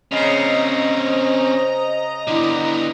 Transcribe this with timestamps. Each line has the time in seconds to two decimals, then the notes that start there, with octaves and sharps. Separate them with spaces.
0.12 C#3 C4 C#4 D#5 A#5
0.96 C5
2.28 D3 B3 E4